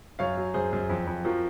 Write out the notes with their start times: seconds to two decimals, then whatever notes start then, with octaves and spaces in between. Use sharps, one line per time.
0.19 F#2 C#5 F5
0.37 F#3
0.54 F#2 G#4 C5
0.73 F#2
0.89 F2
1.07 F2
1.25 F3 F#4 A#4